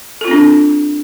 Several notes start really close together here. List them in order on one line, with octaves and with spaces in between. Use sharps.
A4 F4 C4 D4